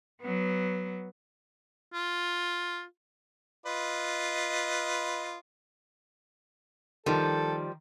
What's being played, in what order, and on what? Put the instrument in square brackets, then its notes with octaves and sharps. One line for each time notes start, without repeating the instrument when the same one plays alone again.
[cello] F#3 B3
[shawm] F4
[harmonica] F4 B4 D#5
[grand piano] D#3 [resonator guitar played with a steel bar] F3 G3 [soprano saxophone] A4